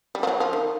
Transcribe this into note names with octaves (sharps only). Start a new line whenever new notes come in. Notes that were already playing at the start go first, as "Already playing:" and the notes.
G3
F3
F#3
F3
D#3